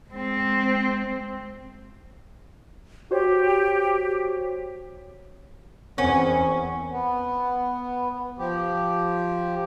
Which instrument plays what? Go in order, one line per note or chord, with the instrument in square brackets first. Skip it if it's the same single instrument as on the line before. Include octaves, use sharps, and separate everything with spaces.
[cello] G#3 C4
[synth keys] F#4 C5 C#5 [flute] G4
[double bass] E2 [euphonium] C4 [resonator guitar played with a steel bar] C#4 [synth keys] A#4 F#5 G#5
[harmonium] B3
F3 G4